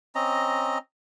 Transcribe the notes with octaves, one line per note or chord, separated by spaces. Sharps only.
C4 C#4 D#5 A#5